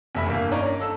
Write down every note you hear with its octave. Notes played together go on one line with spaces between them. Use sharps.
F1 E5 B5
G1 A#3
C#4 D#4 D5 A#5
A#5
A4 E6